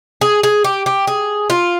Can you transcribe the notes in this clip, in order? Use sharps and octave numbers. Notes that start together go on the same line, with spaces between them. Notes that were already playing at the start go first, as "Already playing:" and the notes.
G#4
G#4
G4
G4
G#4
F4